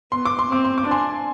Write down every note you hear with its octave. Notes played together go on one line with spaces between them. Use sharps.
B3 C6
D6
C6
C4 D6
C6
D6
D4
G#5 C6